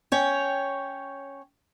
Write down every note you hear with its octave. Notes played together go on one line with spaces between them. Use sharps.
C#4 C#5 G5